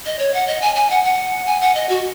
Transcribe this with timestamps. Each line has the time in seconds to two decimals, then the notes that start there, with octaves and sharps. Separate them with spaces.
0.06 D#5
0.19 C#5
0.34 F#5
0.48 D#5
0.62 G#5
0.76 G#5
0.90 F#5
1.05 F#5
1.47 G#5
1.61 F#5
1.75 D#5
1.89 F#4